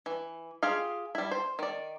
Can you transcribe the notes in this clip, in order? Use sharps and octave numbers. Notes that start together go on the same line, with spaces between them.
E3
F4 G4 G#4 F5
G3 E4
C5
D#3 D5